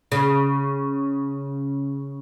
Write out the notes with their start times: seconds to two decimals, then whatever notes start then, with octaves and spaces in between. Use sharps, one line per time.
0.12 C#3